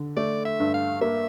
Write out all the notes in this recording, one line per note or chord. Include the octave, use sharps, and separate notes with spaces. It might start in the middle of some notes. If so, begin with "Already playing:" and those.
Already playing: D3
A3 D5
E5
G2
F5
A#3 E5